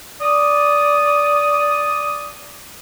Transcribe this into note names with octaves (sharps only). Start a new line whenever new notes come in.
D5 D#6